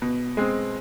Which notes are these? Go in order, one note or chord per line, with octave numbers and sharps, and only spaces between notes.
B2
G#3 C4